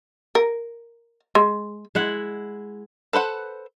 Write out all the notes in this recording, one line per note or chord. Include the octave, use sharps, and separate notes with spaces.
A#4
G#3
G#3 E4 F#5
A4 B4 C5 F#5